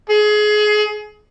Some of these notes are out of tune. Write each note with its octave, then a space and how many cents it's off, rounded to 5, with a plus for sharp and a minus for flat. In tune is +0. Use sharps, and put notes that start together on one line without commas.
G#4 +25